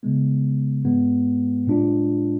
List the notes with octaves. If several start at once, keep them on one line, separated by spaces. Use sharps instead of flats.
C#3 G#3 B3
G#2 G#3 B3
A2 G#3 D4 F4